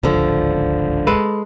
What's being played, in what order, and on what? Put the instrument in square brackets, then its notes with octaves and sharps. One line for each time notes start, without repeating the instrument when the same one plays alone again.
[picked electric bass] D1 G#1 C#2 [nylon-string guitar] D3 F3
[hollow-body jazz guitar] G#3 A4 B4